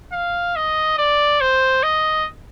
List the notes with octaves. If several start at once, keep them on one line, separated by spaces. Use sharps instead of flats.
F5
D#5
D5
C5
D#5